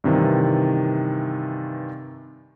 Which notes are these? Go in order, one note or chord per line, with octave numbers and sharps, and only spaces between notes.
G2 C3 D#3 E3